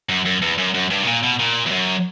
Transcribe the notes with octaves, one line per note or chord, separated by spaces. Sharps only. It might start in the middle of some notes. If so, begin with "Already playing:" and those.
F#2
F#2
E2
F#2
F#2
G2
B2
A#2
B2
A#2
E2
F#2